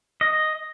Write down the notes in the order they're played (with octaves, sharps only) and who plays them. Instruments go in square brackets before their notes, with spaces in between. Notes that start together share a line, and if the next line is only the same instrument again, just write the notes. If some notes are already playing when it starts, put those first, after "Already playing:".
[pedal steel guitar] D#5